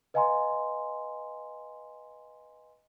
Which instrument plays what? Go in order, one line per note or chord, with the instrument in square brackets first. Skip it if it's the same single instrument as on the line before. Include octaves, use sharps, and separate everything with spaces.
[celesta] B4 D#5 F5 G#5 A#5 C6